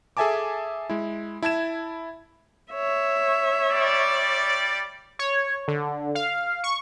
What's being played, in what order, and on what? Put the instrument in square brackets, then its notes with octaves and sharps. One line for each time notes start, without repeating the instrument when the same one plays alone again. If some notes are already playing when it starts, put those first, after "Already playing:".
[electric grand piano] G#4 A4 E5 G#5 A5 D6
G#3 E4
E4 A5 G#6 E7
[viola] C#5 E5
[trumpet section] G3 D5
[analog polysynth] C#5
D3
F5
C#6